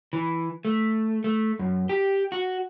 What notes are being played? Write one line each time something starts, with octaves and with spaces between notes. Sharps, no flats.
E3
A3
A3
F#2
G4
F#4